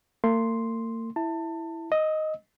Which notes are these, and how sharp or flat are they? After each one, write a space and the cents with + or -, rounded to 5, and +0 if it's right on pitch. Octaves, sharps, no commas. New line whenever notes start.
A#3 -45 C6 +0
E4 +0 A5 +25
D#5 +0 E6 -40